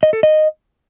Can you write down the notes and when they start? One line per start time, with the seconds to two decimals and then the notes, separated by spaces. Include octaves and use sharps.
0.03 D#5
0.13 A4
0.23 D#5